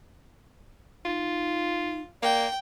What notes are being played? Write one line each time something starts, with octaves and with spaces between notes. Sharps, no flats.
D#4 F4
A#3 D5 G5